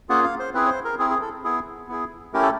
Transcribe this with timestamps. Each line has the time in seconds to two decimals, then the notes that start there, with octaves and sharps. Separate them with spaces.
0.09 A#3 C#4 F4 G#4 F#5
0.24 F5
0.39 C5
0.54 C4 E4 G#4 B4
0.65 C#5
0.69 C5
0.85 A#4
0.99 C4 E4 G#4
1.10 G#4
1.21 A4
1.44 B3 E4 G#4
1.89 B3 E4 G#4
2.33 A3 C#4 E4 G4 A#4
2.42 A4